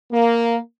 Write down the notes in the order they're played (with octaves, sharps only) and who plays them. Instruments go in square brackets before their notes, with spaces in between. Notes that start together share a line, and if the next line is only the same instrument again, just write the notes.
[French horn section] A#3